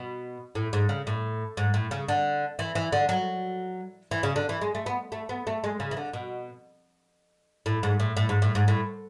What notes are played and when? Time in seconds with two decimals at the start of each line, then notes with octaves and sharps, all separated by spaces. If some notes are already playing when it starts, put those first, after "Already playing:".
Already playing: B2
0.55 A2
0.73 G#2
0.89 C#3
1.07 A2
1.57 G#2
1.74 A2
1.91 C#3
2.08 D3
2.59 E3
2.75 E3
2.92 D3
3.09 F#3
4.11 E3
4.23 C#3
4.36 D3
4.49 E3
4.61 G#3
4.75 A3
4.86 B3
5.12 A3
5.29 B3
5.47 A3
5.64 G#3
5.80 C#3
5.91 E3
5.97 D3
6.13 B2
7.66 A2
7.83 G#2
8.00 A2
8.17 A2
8.29 G#2
8.42 A2
8.55 G#2
8.68 A2